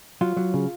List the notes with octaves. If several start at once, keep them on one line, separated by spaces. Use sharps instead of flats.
F#3 F4
F#3
C#3